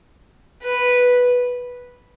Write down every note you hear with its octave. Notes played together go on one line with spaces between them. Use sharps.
B4